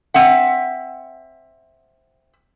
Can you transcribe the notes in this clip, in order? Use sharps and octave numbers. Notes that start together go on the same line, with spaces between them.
C4 E5 F#5